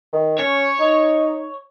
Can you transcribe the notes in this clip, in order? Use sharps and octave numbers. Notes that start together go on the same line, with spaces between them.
D#3
C#4 C#5
D#4